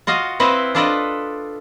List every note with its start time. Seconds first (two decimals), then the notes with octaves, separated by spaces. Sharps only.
0.07 F4 F#4 D#5 F5
0.40 C4 E4 B4 C5 D#5 F5
0.75 D4 F4 A4 B4 D5 D#5